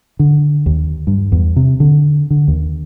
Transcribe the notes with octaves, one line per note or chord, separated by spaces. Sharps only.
D3
D#2
G2
E2
C3
D3
D3
D#2